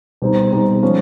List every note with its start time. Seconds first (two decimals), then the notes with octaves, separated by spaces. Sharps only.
0.22 B2 G3 C4 D#4
0.52 B2 G3 C4 D#4
0.83 F3 G#3 C#4